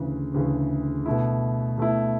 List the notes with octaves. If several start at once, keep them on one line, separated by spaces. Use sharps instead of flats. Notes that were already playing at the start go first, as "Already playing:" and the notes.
Already playing: D2 C#3 E3
D2 C#3 E3
B2 A3 E4
B2 A3 E4